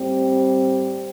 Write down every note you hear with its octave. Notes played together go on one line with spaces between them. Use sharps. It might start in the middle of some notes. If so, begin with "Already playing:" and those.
Already playing: A2 G3 C4